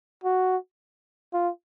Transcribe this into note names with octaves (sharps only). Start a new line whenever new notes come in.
F#4
F4